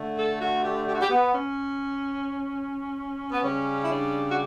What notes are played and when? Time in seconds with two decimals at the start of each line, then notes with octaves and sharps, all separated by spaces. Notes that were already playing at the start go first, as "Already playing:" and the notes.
Already playing: D3 A3
0.16 A4
0.39 F#4
0.63 G4
0.86 G4
0.94 F#4
1.02 G4
1.09 B3
1.32 C#4
3.32 B3
3.42 C#3 G3 C#4
3.84 E4
3.89 D4
4.30 F#4